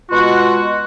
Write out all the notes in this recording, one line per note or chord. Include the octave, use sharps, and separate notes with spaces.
B2 G#3 F4 F#4